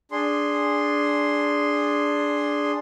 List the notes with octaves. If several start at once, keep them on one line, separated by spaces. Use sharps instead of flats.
D4 G#4 C6